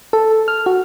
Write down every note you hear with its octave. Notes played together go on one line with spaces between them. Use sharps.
A4
F6
F#4